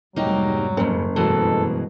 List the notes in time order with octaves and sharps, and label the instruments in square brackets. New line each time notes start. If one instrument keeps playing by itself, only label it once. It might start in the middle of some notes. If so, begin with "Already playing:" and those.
[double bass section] F1 G#2 G3 [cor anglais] F#3 [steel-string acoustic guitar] A#3 D#4 G4
[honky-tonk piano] F#1 [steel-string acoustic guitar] F2 C#3
[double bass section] G2 [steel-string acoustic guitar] B2 E3 G#3 [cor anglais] A4